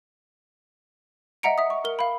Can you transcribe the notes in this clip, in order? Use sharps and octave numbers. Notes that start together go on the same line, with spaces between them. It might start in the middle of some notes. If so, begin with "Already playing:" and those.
D#5 E5 F#5 A#5 C#7 D7
E5 D#6
C#6
A#4 G7
F5 B5